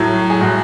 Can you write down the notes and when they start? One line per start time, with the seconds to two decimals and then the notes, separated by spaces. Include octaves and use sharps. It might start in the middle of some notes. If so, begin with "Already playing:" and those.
Already playing: A2 F#3
0.30 G#4
0.41 A2 F#3 F#4